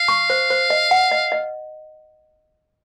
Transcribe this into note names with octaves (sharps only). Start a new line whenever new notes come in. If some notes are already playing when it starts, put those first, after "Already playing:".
Already playing: F5
C#6
C5
C5
D#5
F#5
D#5
D#5